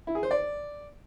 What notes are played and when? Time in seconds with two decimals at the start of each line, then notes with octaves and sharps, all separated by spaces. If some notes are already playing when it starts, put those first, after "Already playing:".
0.07 E4
0.15 G#4
0.23 C5
0.31 D5